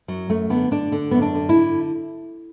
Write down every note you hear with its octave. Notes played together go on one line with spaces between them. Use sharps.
F#2 F#3
F#2 A3
D3 B3
D3 D4
D3
F#2 B3
D4
D3
E4
D3